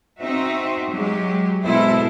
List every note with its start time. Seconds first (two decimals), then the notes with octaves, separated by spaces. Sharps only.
0.19 C4 D#4 F#4 E5
0.92 F#3 G#3 G4
1.64 B2 G#3 E4 A4 C5